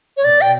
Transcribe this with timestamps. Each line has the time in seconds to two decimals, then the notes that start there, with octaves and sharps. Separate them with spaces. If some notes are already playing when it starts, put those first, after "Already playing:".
0.17 C#5
0.24 B2 D5
0.41 G5